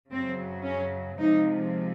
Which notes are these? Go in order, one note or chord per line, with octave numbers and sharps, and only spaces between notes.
F#2 C#3 F#3 C4
C#4
C3 F3 G#3 D#4